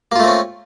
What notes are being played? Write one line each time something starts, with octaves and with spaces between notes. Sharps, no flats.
A3 A#3 C4 C#4 F4